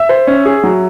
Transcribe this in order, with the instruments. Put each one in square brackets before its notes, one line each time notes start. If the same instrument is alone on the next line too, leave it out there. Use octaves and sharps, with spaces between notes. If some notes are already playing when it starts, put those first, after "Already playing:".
Already playing: [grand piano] E5
[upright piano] C5
C#4
G#4
F#3